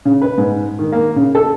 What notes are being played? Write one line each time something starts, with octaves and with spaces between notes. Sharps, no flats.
C#3
B4
G#2
D#3
A#3
C#3
A4